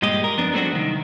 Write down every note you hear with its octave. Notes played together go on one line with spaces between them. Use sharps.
G2 A#2 G#3 G4 D#5
A#4
F2 B3 D4
F#3 A3 C4 D4 F#4
C2 D#3